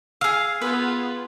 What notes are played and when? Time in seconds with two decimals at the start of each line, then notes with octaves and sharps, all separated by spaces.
0.21 G#4 F5 E6 F6
0.61 B3 F4 G#4 B4